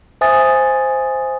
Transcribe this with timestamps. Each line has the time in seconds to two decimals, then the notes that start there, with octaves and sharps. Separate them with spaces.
0.21 C5 E5 G#5 D#6 A6